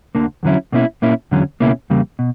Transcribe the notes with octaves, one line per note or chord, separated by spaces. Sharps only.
D2 D3 A#3
E2 D3 F#3 C#4 E4
B2 A#3 C#4 E4
A#2 A#3 C#4 E4
E2 D3 F#3 C#4
C#2 B2 A#3 C#4 E4
E2 C#3 G3 A#3
B2